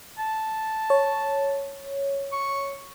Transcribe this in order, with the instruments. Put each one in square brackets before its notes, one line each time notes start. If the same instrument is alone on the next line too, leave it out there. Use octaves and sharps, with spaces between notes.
[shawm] A5
[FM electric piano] C#5
[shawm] C#6